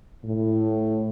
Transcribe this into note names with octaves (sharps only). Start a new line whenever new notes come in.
A2